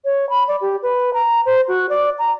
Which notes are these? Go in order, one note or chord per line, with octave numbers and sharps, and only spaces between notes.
C#5
B5
D5
G4
B4
A#5
C5
F#4
D5
A#5